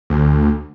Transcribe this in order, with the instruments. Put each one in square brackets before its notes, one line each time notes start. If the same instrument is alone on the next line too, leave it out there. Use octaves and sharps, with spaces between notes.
[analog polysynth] D2